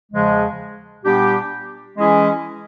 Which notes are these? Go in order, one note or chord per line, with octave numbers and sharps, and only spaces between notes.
E2 C#3 F3 G#3
A#2 G3 B3 D4 G4
E3 G#3 C#4 E4 G#4